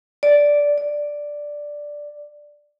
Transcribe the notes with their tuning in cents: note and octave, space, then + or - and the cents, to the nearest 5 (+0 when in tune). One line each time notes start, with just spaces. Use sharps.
D5 -5
D5 +0